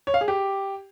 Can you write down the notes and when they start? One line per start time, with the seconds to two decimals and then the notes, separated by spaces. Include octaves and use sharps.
0.07 C#5
0.14 F5
0.21 G#4
0.28 G4